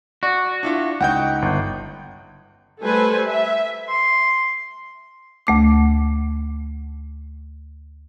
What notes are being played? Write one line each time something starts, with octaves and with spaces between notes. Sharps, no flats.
F#4 D5
D4 E4 F4
C#2 D#4 F#5 G5 G6
G1
G3 A3 A4 B4 C5 G#5
E5
C6
D2 A3 D6